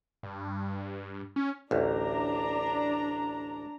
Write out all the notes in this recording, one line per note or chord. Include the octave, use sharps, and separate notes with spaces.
G2
C#4
A1 D2 D4 A#5